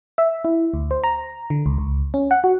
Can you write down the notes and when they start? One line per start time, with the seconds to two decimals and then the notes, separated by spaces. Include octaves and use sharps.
0.18 E5
0.45 E4
0.74 D2
0.91 C5
1.04 A#5
1.50 D3
1.66 C#2
1.78 C#2
2.14 C#4
2.31 F#5
2.44 F#4